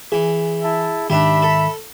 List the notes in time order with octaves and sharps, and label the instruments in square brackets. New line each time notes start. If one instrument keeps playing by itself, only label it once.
[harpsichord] E3 [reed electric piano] G#4
[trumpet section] E4 E5 A5
[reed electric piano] G#2 D#3 [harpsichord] D4 G4 [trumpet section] E5 B5
[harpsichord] A4